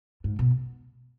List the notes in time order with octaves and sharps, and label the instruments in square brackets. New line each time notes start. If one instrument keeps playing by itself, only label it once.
[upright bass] G#2
B2